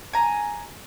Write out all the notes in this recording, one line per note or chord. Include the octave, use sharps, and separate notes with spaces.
G#5 A#5